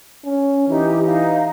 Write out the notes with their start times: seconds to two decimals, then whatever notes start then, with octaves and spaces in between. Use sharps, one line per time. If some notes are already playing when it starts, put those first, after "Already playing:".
0.25 C#4
0.68 E3 D#4 G4
1.05 D#4 F5